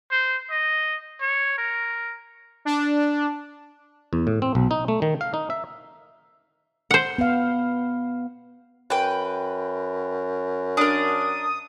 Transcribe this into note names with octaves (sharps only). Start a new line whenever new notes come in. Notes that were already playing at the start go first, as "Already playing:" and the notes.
C5
D#5
C#5
A#4
D4
E2
A2
C4
B1
D#4
A3
D#3
F5
D#4
E5
C5 F#5
B3 F5
F#2 B4 G5
D4 A#4 D#6